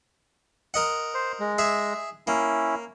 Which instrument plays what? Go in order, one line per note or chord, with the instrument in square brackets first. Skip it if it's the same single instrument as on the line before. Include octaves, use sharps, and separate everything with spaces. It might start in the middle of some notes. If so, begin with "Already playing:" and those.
[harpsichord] A#4 D#5 F#5
[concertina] C5
G#3
[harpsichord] G#4 E5
[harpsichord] A#3 [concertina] C#4 E4